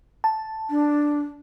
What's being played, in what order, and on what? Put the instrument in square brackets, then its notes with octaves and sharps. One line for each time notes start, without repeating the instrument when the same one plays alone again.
[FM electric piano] A5
[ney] D4